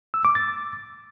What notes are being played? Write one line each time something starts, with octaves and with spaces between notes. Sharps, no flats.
E6
D6
A6